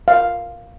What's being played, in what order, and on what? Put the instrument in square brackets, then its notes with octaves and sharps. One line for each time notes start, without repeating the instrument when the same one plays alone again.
[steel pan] F5